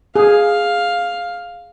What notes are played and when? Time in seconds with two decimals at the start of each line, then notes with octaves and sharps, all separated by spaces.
0.16 G#4 F5